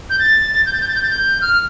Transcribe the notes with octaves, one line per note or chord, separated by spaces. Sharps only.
G6
A6
G6
A6
G6
A6
G6
A6
G6
F6